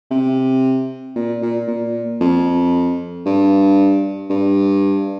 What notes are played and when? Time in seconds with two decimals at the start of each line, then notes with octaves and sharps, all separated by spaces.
0.11 C3
1.16 A#2
1.42 A#2
1.68 A#2
2.21 F2
3.26 G2
4.30 G2